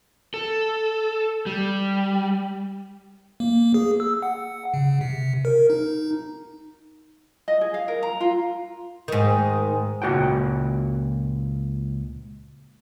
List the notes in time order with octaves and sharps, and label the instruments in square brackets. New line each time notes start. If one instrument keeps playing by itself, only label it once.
[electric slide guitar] A4
G3
[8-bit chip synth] A#3
G#4
E6
F#5
C#3
C3
A#4
D#4
[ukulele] D#5
G#4
F5
A#4
A#5
F4
[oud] G#2 D#3
[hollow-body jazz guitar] C#2 A#2 B3 F#4 F#5 G5